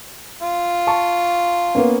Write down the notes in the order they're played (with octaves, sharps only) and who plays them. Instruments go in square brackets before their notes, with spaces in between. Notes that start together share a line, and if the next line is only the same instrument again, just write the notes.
[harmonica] F4
[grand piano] A5 C#6
A#3 B3 C#4